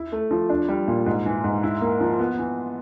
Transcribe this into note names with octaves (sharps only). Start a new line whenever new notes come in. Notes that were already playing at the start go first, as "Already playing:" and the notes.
Already playing: E4
A3
F3
D4
G3
A#2
G#2
E3
G#2
E4
A#3
F3
B3
E3